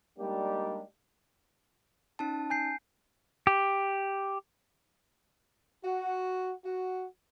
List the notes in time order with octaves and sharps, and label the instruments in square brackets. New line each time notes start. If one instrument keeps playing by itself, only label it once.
[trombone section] G3 G#3 A#3 D4 D#4 G4
[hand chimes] C#4 D#4 A5
[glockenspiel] G#5 G6 C7
[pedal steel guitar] G4
[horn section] F#4
F#4